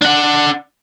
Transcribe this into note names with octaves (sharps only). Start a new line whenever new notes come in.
D4 F#5